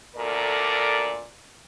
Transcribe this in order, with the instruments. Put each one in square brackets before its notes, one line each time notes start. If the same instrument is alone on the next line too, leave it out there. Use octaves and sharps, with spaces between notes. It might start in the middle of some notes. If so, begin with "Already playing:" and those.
[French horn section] D2 A#2 A4 A#4 D5